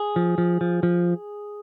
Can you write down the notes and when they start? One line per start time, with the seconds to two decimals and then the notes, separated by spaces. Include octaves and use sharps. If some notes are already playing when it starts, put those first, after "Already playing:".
Already playing: G#4
0.16 F3
0.38 F3
0.61 F3
0.83 F3